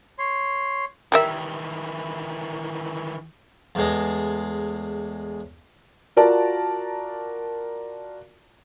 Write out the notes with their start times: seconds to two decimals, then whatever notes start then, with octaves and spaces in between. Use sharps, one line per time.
0.19 C#5 C6
1.12 D#3 E3 G3 A#4 E5
3.75 E2 A2 G#3
6.16 F4 F#4 A#4 D5 A5